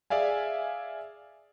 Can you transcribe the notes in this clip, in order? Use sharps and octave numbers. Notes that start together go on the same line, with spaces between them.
G#4 D5 E5 F5 G#5